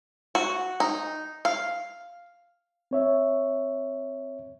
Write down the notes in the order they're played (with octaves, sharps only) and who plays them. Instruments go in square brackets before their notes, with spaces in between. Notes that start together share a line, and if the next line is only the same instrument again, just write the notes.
[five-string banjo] F#4
D#4
F5
[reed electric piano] C4 C#5 E5